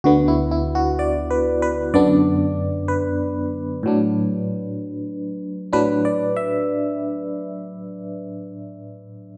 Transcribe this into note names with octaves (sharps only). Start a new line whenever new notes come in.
D2 D3 B3 F#4
E4
E4
F#4
D5
B4
B4
F#2 D3 B3 D4 D5
B4
A2 F#3 D4
A2 F#3 D4 B4
D5
E5